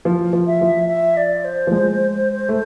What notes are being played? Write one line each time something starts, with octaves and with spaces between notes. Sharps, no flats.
F3
F3
E5
F3
E5
D5
C5
F3
G#3
A3